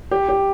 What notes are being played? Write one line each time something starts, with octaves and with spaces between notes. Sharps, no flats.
G4
G4